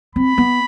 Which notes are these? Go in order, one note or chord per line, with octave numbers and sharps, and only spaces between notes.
C4 B5
B3